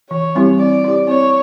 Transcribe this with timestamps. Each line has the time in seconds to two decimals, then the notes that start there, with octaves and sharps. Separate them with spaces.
0.10 E3 C#5
0.35 G3 C4 E4 G4
0.59 C4 D5
0.84 E4 G4
1.07 C4 C#5